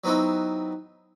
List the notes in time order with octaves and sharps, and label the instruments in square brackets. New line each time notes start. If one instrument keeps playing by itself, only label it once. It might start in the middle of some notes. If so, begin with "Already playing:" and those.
[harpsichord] F#3 B3 C4 D#4 E4